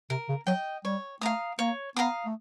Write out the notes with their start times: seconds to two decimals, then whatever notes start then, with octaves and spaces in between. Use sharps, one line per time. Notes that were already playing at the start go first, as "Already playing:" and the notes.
0.10 C3 A#4
0.29 C#3
0.47 F#3 D#5 G5
0.85 G3 C#5
1.21 A3 F5 A#5 D#6
1.59 A#3 C#5
1.96 B3 F5 A#5 D#6
2.26 A3